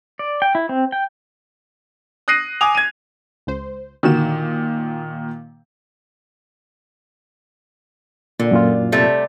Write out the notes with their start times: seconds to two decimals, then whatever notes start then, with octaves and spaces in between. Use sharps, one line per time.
0.19 D5
0.42 G5
0.55 E4
0.69 C4
0.92 G5
2.28 D#6 F#6 A#6 C7 D#7
2.61 G#5 D6 D#6 F7
2.75 G#6 D#7
3.47 C#2 C5
4.03 A#2 D3 D#3 F#4 E7
8.40 A#2 D3
8.51 F#2 A#2 F4
8.92 C3 G3 A3